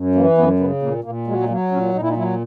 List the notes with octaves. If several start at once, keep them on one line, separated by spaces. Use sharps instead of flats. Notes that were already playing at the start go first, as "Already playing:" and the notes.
Already playing: F#2
E3 A#3
F#2 B3
C#3 B3
A#2 A#3
A#2 A#3
F#3 G#3
G#3
F#3 A#3
A#2 C#4
A#2 D#4
E4
D#4
F#3 E4